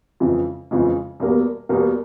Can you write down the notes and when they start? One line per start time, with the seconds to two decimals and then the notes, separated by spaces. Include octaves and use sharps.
0.20 F2 C#3 E3 G#3
0.71 F2 C#3 E3 G#3
1.20 E2 B2 G3 A#3
1.69 E2 B2 G3 A#3